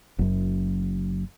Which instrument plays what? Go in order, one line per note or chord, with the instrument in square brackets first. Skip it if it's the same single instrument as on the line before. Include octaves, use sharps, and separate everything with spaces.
[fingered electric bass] F#1 F#2